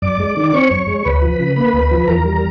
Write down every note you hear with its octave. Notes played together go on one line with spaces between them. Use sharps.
F#2 D5 D6
G#3
D#3
C4 C#5 C#6
F#2
G#3
D2 B4 B5
F3
C#3
A#3 B4 B5
D2
F3
E2 A#4 A#5
G3